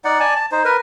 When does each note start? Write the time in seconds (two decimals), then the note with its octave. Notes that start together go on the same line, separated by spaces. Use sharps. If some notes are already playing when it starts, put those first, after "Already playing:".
0.04 D#4 D5 F#5
0.20 D5 G#5 A5
0.36 A5
0.52 D#4 C5
0.65 A#4 B4